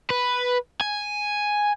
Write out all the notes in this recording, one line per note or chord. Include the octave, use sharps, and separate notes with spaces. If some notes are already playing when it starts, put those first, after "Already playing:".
B4
G#5